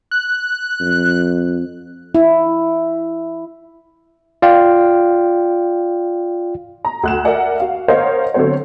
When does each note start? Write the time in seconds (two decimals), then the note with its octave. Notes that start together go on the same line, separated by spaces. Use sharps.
0.11 F#6
0.81 F2
2.15 E4
4.42 F4 D5 F5 G5
6.85 A#5
7.03 D2 F#6 E7
7.25 A#4 D5 E5 F#5 G#5
7.60 F#4 F5
7.88 A#4 C5 C#5 D#5 F5 F#5
8.34 D3 F#3 B3 C4 C5 C#5